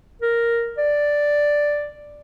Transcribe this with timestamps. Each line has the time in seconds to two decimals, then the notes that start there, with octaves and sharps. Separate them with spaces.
0.22 A#4
0.78 D5